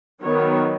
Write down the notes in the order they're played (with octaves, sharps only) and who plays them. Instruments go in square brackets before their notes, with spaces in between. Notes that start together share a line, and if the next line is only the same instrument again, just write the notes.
[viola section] D#3 F#3 B3 C#5